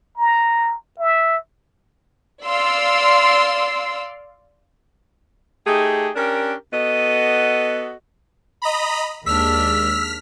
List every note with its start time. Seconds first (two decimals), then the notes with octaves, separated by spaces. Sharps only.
0.17 A#5
0.99 E5
2.45 D5 F5 C6 E6
5.66 A3 D#4 G4 G#4
6.15 C#4 D4 G4 A#4
6.72 B3 F#4 A4 D#5
8.62 D#5 A#5 B5
9.26 D#2 G#3 D4 E6 F6 B6